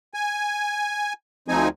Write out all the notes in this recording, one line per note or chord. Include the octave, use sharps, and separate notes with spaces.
G#5
D2 F3 C4 D#4 G#5